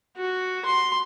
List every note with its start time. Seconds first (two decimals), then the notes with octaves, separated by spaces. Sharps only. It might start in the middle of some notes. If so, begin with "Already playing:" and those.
0.17 F#4
0.65 C6